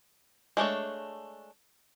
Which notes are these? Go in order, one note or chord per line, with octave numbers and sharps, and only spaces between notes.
G#3 A3 D4 C#5